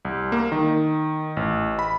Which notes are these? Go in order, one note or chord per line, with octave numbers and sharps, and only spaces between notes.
C2
A#3
D#3
A1
B5